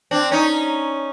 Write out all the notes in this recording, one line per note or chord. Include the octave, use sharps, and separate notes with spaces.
C4 D4
C#4 D#4